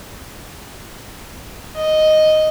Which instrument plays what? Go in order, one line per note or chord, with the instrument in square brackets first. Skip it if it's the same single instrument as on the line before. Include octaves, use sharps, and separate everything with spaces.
[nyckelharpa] D#5